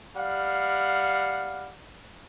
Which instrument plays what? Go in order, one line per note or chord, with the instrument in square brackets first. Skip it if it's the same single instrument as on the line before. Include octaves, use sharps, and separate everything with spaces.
[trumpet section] G3 F5 F#5